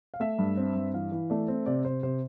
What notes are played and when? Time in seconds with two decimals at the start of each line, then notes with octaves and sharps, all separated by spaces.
0.14 F5
0.20 A3 E5
0.38 G2
0.57 C4
0.75 G2
0.94 E3 F5
1.12 E3
1.30 A3 D5
1.48 C4
1.66 C3 D5
1.85 C3 C5
2.03 C3 C5